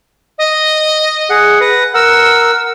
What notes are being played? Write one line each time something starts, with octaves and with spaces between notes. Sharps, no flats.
D#5
G#4 F#5
B4 A#6
A#4 F#5 E6